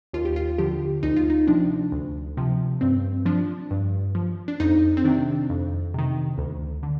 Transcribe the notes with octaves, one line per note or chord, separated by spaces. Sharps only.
D#2 F4
G4
F4
D3 F3 G4
D2 D#4
F4
D#4
C3 F3 D4
D2
C3 F3
G2 C4
F3 D4
G2
F3
D4
F2 D#4
C4
C3 D#3 D4
F2
C3 D#3
D2
D3